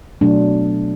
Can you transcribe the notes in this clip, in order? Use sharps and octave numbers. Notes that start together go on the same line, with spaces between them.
B2 F#3 A3 D4